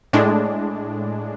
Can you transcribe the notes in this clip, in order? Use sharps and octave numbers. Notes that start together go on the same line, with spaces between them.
A2 G#3 D4